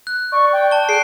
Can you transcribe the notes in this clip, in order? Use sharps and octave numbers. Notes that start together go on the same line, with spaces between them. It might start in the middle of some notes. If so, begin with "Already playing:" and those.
F#6
D5 C#6
G5
A5 G7
G#4 F#6 C7 D7